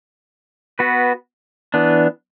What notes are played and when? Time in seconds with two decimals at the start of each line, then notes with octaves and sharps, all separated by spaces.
0.79 B3 F#4 B4
1.74 E3 B3 D4